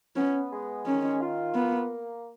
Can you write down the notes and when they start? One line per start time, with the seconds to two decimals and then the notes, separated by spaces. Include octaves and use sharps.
0.16 B3 C#4
0.51 G#3
0.86 D#3 C#4
1.21 F4
1.55 A#3 B3